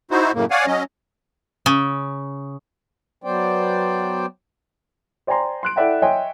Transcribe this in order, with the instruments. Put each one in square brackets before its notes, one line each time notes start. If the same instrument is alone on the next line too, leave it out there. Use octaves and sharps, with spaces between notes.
[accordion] D#4 E4 F#4 C5
F#2 A2 C#3 A#3
C#5 D5 F5 F#5 G#5
F#3 C#4 D#5
[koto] C#3
[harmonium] F#3 B3 C5 D5 G5
[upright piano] C5 D5 G5 G#5 A#5 C6
C6 F#6 D7
E4 A4 D5 E5 F#5 G5
C#5 D#5 E5 G5 G#5 C6